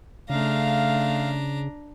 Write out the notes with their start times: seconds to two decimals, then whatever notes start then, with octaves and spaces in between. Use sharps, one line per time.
0.30 C#3 A3 D4 F5 A#5